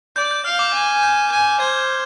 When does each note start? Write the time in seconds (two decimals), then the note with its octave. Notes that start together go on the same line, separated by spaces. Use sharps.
0.16 D5 G6
0.31 G6
0.45 F5 F6
0.59 D6
0.73 G#5
1.03 G6
1.32 G#5
1.60 C5 G#6